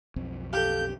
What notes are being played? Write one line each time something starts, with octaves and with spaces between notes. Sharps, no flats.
B1 F2 C4
G4 A4 F5 G6